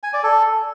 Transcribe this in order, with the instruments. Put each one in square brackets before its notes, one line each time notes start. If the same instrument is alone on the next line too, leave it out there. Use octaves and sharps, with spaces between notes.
[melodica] G#5
D5
A4